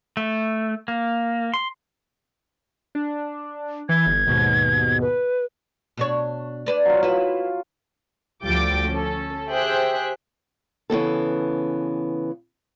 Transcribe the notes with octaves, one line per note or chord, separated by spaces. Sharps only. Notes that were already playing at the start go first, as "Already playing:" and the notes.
A3
A#3
C6
D4
E3 G#6
G1
D#2 G#2 B2
B4
B2 D4 C#5
D4 B4 D5
F#3 F4
E4 F4 B4
D2 F3 G3 G5 D6 A6
C#4 A4
G4 G#4 C5 E5 G5 F#6
C#3 E3 B3 A4